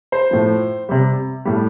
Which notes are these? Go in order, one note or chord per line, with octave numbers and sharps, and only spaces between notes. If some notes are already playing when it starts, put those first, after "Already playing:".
C5
A2 F3
C3 G3
A2 G3